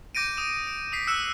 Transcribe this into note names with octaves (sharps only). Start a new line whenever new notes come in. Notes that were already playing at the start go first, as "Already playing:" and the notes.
D6 G6 A#6 D7 D#7
D#6 E7
D7
D#6 B6 C7
E6 F#6 C#7 E7